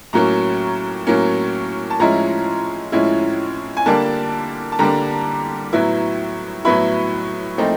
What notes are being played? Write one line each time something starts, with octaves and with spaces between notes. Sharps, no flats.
A2 F#3 A#3 C#4 A#5
A2 F#3 A#3 C#4
A5
A2 F3 G#3 C#4 E4 A#5
A2 F3 G#3 C#4 E4
G#5
D3 G3 A#3 D4 A5
A5
D3 G3 A#3 D4 A#5
A2 F#3 B3 E4
A2 F#3 B3 E4 B5
A#2 F3 A3 C4 D#4